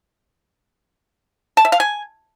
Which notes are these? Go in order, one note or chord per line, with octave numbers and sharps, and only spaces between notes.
A5
E5
F5
G#5